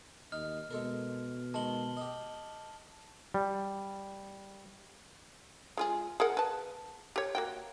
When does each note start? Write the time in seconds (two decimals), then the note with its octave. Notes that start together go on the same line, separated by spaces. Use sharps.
0.32 D#2 D#4 F6
0.71 B2 G#3 A4 A#4
1.54 D#3 G#3 A#4 A5 F#7 G7
1.97 G4 D#5
3.34 G3
5.77 G#3 F4 G#4
6.20 G#4 A#4 F#5
6.37 B4 A5
7.16 G4 C#5
7.35 A#3 F#4 G5